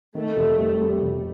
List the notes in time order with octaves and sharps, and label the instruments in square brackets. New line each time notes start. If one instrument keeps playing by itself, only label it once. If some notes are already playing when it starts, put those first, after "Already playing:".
[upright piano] D#3 [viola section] A3
[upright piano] F1
G3
G3
F1